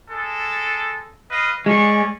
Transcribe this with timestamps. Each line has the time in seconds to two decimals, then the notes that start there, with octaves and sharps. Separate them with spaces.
0.11 G#3 A4
1.31 B4 D#5 F5
1.66 G#3 C#4 D5 C#6